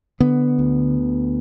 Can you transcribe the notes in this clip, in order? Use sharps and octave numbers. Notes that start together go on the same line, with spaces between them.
D3 B3
D2